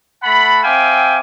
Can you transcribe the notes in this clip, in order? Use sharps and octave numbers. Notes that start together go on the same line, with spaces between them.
A3 F#5 A5 B5
C4 E5 F5 G5 G#5 D6